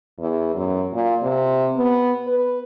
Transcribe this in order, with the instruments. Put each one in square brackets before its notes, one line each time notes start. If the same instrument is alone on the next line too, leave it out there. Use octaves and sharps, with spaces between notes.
[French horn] E2
F#2
A#2
C3
B3
B4